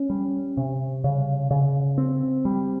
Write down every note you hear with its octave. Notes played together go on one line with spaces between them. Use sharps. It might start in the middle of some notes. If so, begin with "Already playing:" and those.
Already playing: C#4
G3
C3
C#3
C#3
C4
G3